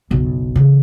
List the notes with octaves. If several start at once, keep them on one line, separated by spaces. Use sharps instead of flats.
F#1 B1
C#3 E3